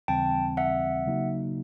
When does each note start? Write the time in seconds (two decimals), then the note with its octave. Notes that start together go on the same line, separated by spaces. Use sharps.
0.08 D#2 C#3 E3 G3 C4 G5 A5
0.57 E5 F#5
1.06 C#3 F#3 A#3 D#4 F#4